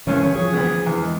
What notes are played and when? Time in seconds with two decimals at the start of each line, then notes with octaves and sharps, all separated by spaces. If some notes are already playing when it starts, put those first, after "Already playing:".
0.07 C2 G2 E3 C#4
0.23 C#3 C4 C#4 C#5
0.35 E3 F3 G#4
0.53 D2 B3
0.86 E2 E3
1.03 G#3